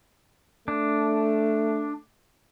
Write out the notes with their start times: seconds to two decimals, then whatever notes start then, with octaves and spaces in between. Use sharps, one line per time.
0.68 A3 D4